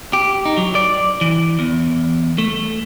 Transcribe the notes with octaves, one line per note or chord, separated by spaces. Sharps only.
G4
D#4
F#3
D5
E3
E2
A3